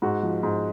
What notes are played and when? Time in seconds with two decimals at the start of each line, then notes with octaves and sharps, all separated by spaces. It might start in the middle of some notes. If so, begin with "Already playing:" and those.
0.02 G#2 F#4
0.23 F3
0.43 G#2